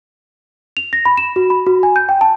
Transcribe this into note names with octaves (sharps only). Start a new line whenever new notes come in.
F7
A#6
B5
E7
F#4
B5
F#4
G#5
G6
G5
A5